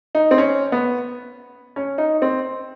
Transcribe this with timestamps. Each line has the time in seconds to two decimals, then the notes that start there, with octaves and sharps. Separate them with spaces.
0.15 D#4
0.31 C4
0.38 C#4
0.72 B3
1.76 C#4
1.98 D#4
2.22 C4